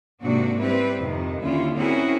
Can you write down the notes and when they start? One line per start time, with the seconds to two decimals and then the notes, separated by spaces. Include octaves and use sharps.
0.21 G#2 C3 A#3 D4 F#4
0.59 G3 C4 E4 B4
0.97 F2 C3 D#3
1.41 D#2 D3 C#4 E4 F4
1.75 C4 C#4 E4 F#4 G#4 A#4